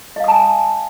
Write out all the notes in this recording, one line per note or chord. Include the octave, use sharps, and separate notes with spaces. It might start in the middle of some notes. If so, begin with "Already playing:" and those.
D#5 F5 G#5 A5 D#6